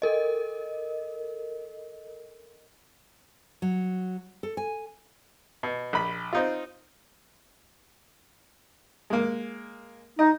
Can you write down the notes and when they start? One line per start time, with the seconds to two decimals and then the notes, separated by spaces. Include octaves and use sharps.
0.02 A4 A#4 D#5
3.62 F#3
4.43 A4
4.57 G#5
5.63 B2
5.93 A#1 B5
6.33 C4 D#4 F4
9.10 G#3 A#3
10.19 D#4 D#5